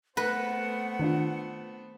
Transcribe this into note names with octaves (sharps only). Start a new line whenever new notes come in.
A3 B3 C4 B4 F#5 A#6
D#3 D4 F4